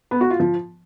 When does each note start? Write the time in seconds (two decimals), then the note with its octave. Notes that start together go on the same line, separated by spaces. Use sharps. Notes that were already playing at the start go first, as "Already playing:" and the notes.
0.11 B3
0.21 F#4
0.30 F4
0.40 F3